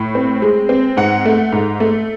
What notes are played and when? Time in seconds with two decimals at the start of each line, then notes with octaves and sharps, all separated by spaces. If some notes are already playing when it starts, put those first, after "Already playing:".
Already playing: A2
0.15 C4
0.42 G#3
0.69 C4
0.97 G#2 F#5
1.25 A3
1.52 G#2
1.80 A3